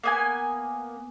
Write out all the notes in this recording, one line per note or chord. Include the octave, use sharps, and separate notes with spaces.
A#3 B3 G#5